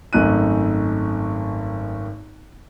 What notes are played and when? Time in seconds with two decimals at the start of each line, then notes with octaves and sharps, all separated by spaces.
0.13 G#1 F#2 A3 D#4 F#6 D#7